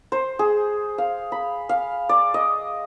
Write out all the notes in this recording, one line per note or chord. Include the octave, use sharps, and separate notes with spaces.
C5
G#4
F5
B5
F5
D5
D#5